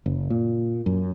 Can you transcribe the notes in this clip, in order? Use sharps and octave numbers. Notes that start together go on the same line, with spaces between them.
F#1
A#2
F#2